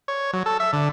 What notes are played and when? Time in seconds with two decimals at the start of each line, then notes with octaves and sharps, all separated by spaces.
0.08 C#5
0.33 F#3
0.46 A4
0.60 E5
0.73 D3